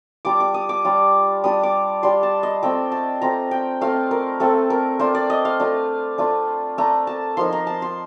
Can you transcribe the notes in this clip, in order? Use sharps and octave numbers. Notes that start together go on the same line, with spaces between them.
G3 D4 F4 D6
D6
D#6
D6
G3 D4 F4
G3 D4 F4 D#6
D6
G3 D4 F4 C6
A5
D#5
A3 C4 F4 G5
A5
A3 C4 F4 A#5
G5
A3 C4 F4 F5
A#4
A3 C4 F4 A4
A#4
A3 D4 F4 C5
D5
D#5
F5
A3 D4 F4
A3 D4 F4
A3 D4 F4 A#5
A5
F3 A#3 D#4 C6
A#5
A5
C6